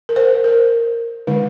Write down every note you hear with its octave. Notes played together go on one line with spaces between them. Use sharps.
A#4
C5
A#4
D3 G#3 D#4